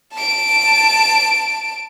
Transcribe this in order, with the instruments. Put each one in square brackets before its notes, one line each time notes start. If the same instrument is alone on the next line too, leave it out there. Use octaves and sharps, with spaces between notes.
[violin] A5 D7